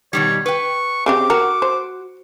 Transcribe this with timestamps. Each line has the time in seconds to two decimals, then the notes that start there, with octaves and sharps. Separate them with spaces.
0.13 B2 D#3 G3 C#5
0.46 B4 G5 C#6
1.06 C#3 C4 G4 D6
1.30 F#4 A#4
1.62 C5